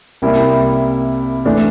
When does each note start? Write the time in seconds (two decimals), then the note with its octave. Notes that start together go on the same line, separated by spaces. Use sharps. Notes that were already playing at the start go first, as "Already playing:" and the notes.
0.22 C2 C3 G3 A#3 E4
1.45 E3 A3 D4